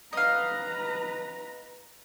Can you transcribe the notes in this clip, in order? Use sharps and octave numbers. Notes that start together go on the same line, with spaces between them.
B4 D#5 F5 A#5